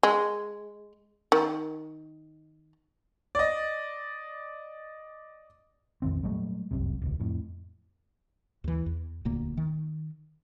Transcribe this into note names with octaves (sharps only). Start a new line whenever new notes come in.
G#3
D#3
D5 D#5
A#1 F2 D#3 C4
A#2 F#3 G3 A3
F1 C2 F#2 C3
D#1 C#2
F2 A2
D#2 E3
E2
E1 D2 A#2 A#3
D#3